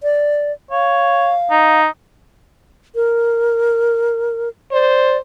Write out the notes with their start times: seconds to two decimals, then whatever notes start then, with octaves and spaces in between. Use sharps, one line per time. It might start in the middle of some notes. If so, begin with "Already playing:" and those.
0.03 D5
0.71 C#5 F5
1.51 D#4
2.95 A#4
4.72 C5 D5